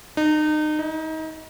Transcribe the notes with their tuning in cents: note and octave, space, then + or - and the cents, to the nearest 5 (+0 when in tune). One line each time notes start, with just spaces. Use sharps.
D#4 -30
D#4 +30